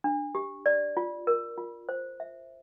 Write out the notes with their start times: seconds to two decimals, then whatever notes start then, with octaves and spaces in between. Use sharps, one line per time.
0.04 D4
0.35 G4
0.66 D5
0.97 F4
1.27 A#4
1.58 F4
1.89 C5
2.20 E5